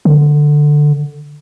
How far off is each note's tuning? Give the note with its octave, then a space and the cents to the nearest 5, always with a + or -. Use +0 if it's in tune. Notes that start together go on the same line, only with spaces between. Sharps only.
D3 +10